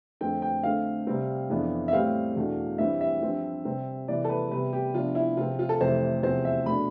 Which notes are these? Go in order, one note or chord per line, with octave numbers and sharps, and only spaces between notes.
F2 D3 A3 C4 G5
G5
D3 A3 C4 F5
C3 G3 C4
F2 E3 B3 D4
E5
A2 G3 C4 F5
E2 B2 A3 D4
G2 E3 G3 C4 E5
E5
G2 F3 C4
C3 G3 C4
C3 E3 G3 B3 D5
A4
B4
C3 G3 B3 B4
G4
C3 F3 B3 D4 F4
E4
C3 F3 C4 F4
F4
A4
F2 C3 E3 A3 C5
E2 C3 F3 C4 C5
E5
B2 A3 D4 B5